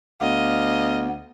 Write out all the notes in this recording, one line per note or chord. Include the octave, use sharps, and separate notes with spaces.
D2 B3 D#5 F5